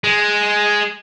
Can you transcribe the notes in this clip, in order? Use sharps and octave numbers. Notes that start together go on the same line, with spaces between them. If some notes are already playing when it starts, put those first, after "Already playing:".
G#3